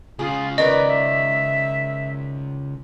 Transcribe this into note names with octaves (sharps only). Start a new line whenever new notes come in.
C#2 C#3 F4 G#4
D#3 A#4 B4 D5 D#5
E5